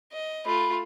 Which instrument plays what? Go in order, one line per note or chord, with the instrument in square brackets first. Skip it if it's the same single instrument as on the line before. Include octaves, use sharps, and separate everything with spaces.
[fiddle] D#5
[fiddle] A3 F4 [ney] B5